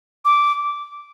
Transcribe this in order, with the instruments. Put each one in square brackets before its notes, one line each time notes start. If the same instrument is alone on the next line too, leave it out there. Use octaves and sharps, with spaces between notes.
[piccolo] D6